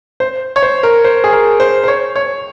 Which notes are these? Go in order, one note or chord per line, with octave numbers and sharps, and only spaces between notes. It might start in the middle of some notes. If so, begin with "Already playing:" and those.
C5
C#5
C5
A#4
C5
G#4
A#4
C5
C5
C#5
C#5